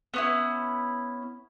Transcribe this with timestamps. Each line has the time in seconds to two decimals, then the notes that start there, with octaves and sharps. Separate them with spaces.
0.14 B3 C#4 E4